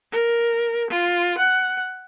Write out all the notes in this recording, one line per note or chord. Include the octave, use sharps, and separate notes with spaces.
A#4
F4
F#5